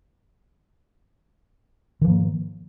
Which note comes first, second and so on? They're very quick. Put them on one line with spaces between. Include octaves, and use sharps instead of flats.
D#3 F3 G#2 A#3